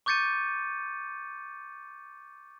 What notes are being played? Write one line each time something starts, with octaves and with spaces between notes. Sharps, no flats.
C#6 D6 G6 A6 C#7 D#7